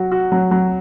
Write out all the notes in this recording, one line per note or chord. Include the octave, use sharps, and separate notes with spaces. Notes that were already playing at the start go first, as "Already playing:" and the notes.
Already playing: F#3 F#4
F#4
F#3
F#3